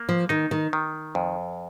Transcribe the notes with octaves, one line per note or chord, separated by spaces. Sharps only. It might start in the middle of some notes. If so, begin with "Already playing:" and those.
Already playing: A#3
F3
D#3 D#4
D#3
D#3
F2